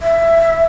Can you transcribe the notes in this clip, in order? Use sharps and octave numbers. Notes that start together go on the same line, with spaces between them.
E5